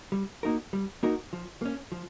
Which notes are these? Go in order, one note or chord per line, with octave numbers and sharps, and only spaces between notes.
G3
A#3 D#4 F#4 A#4
G3
A#3 D#4 F#4 A#4
F3
A#3 C#4
F3